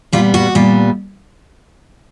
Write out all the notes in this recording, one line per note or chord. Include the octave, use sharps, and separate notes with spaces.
A#2 G3 B3 F4
F#4
A#2 G3 B3